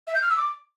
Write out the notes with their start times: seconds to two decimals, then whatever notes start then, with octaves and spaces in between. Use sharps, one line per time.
0.07 E5
0.15 G6
0.22 F6
0.30 E6
0.37 D6